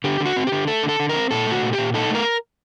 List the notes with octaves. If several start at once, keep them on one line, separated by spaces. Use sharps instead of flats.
D3 G4
D3
F#4
C4
G4
D3
A3 A4
D3
A4
D3
A#4
C4
A#2 A4
A3 F#4
A#2
G4
A#2
D#4 A4
A3 A#4